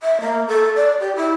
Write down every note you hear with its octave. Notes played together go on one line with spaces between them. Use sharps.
E5
A#3
A4
D5
G4
E4